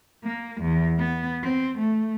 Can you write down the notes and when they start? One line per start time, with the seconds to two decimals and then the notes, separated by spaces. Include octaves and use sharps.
0.25 A#3
0.61 E2
0.98 B3
1.43 C4
1.79 A3